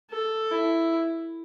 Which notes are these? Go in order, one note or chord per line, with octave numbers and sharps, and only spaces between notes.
A4
E4